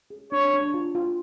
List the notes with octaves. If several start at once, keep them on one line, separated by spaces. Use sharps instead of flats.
G#4
D4 C#5
D4
F4
F4